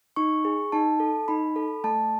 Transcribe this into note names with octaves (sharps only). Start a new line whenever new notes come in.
D#4 C#6
G#4
D#4 A5
A4
D#4 B5
A4
A3 A5